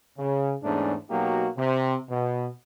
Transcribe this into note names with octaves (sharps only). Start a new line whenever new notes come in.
C#3
E2 G#2 A3 C#4 D4
B2 F#3 A#3 D#4 F#4 G4
C3
B2